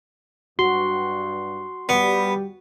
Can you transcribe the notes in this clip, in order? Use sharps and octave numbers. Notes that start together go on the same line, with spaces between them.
G2 F#4 C6
G3 B3